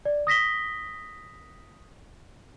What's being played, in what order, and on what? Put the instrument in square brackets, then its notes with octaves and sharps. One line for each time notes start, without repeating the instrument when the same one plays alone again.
[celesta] D5
D#6 A#6 B6 G7